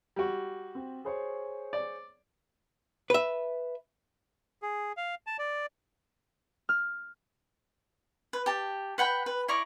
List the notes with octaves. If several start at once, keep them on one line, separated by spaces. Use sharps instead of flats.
G3 F#4
C4
G#4 C5 C#5
D5
B4 E5
G#4
F5
A5
D5
F6
B4
G4 A5
B4 F#5 G5 B5
B4
E4 D5 A#5 C#6